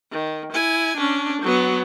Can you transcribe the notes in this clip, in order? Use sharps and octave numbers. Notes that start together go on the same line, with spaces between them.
D#3
E4 G#5
C#4 D4
F#3 B3